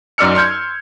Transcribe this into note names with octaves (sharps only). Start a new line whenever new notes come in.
F#2 D#4 D5 E6 F6 C#7
C6 F6 G6 G#6